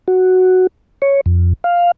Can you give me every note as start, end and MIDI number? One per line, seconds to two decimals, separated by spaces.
0.08 0.67 66
1.02 1.21 73
1.26 1.53 41
1.64 1.91 77